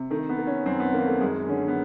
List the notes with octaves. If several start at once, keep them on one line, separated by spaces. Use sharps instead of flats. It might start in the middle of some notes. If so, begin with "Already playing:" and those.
Already playing: C3
D#3 A3
B3
D#3
C#4
F#2 C4
B3
D#3 A#3
A3
F#2 G#3
D3 C#4
B3